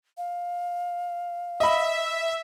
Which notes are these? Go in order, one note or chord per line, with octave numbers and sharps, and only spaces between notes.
F5
D#5 E5 B5